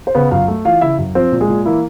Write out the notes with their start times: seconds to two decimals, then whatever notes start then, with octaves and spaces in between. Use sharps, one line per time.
0.07 C5
0.15 C#3 B3 B4
0.31 F#2 F4 F5
0.48 A3
0.65 E3 F4 F5
0.81 C#3 E4 E5
0.98 F#2
1.15 F3 C4 C5
1.32 A#2
1.40 G#3 G#4
1.49 A#2
1.66 E3 A#3 E4